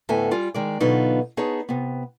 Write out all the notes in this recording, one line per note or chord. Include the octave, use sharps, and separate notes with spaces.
D2 A2 B3 A4 E5 G#5
G3 F4 G#5
D#3 G#3 D5
B2 D3 F#3 B3 D#4 F4
B3 D#4 G#4 C#5 A5
C3 B3